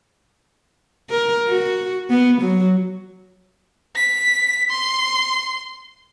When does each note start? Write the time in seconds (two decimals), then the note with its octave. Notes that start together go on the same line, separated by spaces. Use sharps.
1.10 A#4
1.48 F#4
2.10 B3
2.41 F#3
3.96 B6
4.70 C6